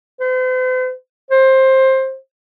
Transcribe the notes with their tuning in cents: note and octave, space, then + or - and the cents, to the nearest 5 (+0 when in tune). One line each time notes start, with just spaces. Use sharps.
C5 -45
C5 +15